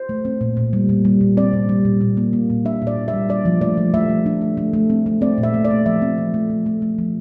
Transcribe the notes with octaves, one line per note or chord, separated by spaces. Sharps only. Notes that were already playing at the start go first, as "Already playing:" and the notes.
Already playing: C5
A3
C4
A#2
A#2
G3
A#2
G3
A#2
C4 D5
A#2
G3
A#2
A#2
A#3
A#3
A#2
D4 E5
A#2
D5
A#3
E5
G3
D4 D5
F3
A3 D5
F3
A3 E5
A3
D4
A3
A3
A3
C4
A3
C4 D5
A#2
E5
A3
D5
A3
F3 E5
C4
F3
A3
F3
A3
A3
F3